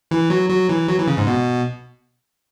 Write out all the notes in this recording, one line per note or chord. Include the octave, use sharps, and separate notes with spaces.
E3
F#3
F#3
E3
F#3
E3
C#3
G#2
B2